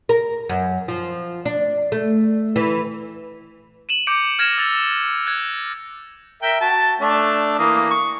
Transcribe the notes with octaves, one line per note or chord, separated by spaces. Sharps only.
A#4
F#2
F3
D4
A3
E3
D#7 E7 F#7
D6 G6 C#7 D7
F6 G#6 A#6 E7
E6 A6 F7
F#6 G#6
A#4 E5 G5
F#4 A5
A3 D4
E3 A#3 D#6
C#6